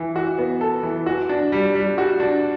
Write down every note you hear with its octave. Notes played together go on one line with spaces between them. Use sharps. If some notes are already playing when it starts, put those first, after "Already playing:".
Already playing: E3
F#4
B3
A4
E3
F#4
D4
G3
G3
F#4
D4